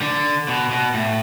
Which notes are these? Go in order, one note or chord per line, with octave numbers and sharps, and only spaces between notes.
D3
B2
B2
A2